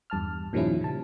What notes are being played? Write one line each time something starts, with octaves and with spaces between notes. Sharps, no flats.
E2 G2 A5 F6
A#2 D#3 F3 G3 C#4 E4
C#3 A5